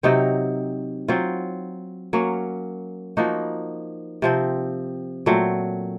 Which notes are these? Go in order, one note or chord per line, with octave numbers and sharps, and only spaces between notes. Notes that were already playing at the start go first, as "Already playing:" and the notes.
C3 F#3 C4 D#4
F#3 C4 F4
F#3 A#3 C#4
F3 A#3 D#4 F#4
C3 F3 C4
A#2 F#3 A3 C4